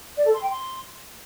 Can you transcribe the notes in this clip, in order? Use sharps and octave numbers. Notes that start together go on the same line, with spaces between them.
D5
A4
C6
G5
C6